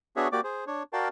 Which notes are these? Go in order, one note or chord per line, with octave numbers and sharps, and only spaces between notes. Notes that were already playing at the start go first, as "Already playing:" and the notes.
B3 D4 F#4 G#4 C#5 E5
A#3 F#4 G4 D5 D6
G#4 C5
D4 C#5
F#4 A#4 D5 F5 G5 A5